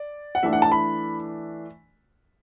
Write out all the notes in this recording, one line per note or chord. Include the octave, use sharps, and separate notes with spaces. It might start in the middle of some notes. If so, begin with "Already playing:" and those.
Already playing: D5
F#5
E3 A3 D4 E5
F#5
A5
B5